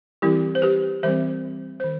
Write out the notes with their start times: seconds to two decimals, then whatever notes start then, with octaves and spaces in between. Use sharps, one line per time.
0.22 E3 G3 C4 E4 G4
0.55 C5
0.62 G4 B4
1.03 E3 G3 C4 C5 E5
1.80 C5
1.84 D#3